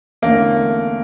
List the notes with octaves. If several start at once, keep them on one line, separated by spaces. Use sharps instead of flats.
E2 D3 A3 A#3 C#4